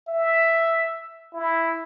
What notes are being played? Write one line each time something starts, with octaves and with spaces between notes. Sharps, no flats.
E5
E4